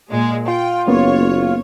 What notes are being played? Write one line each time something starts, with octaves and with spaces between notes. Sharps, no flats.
A#2 G#3
F4 G5
F#1 A#3 B3 C#4 C#5